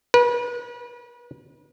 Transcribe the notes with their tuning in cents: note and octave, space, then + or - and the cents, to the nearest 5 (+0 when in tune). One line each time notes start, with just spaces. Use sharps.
B4 -35